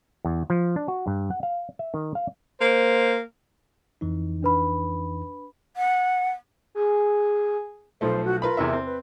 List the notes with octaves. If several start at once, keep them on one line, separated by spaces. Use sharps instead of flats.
E2
F3
D4
F#4
G2
F#5
F5
E5
D#3
F5
A#3 C5
F2 E3 D#4
D4 B4 B5
F#5
G#4
B1 F3 A3 C5
F#4
F4 A#4 B4 B5
E2 C3 E5
C4
B4